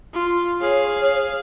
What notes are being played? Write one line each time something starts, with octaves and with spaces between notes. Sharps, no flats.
F4
G#4 C#5 F5